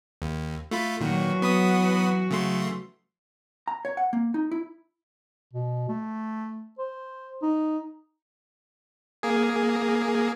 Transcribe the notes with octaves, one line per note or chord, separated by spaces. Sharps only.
D#2
A3 F4 B5
A#2 D#3 E3 F#3 F#4
B3 B5 D#6
C#3 A3 C6
A#5
C#5
F#5
A#3
D#4
E4
B2
A3
C5
D#4
A#3 G#4